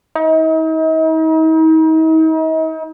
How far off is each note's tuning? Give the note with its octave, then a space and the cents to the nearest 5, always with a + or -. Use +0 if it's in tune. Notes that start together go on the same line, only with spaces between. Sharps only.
D#4 +40